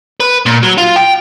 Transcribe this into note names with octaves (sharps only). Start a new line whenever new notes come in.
B4
A#2
F#3
F4
G5